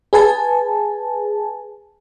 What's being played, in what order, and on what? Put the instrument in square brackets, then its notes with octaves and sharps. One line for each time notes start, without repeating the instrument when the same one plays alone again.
[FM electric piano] G#4 B4 G#5 A5